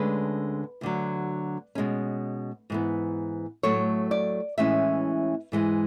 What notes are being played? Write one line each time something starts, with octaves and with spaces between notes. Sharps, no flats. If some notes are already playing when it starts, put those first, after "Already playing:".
Already playing: D2 D3 G#3 C#4 B4
D2 D3 F#3
B2 G#3 C#4
G#2 E3 B3
A2 F#3 A3 C#5
D5
A2 E3 G#3 C#4 E5
G#2 E3 G#3